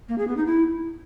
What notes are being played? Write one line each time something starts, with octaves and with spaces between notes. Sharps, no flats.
A#3
G#4
B3
D#4
E4